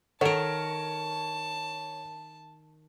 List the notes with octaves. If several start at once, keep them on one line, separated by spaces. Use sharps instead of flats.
D#3 A4 A#4 C#5 D#5 F#5 A5 D7